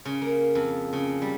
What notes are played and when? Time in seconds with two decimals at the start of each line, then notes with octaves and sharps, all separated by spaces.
0.05 C#3
0.22 A#3
0.55 F2
0.93 C#3
1.22 G3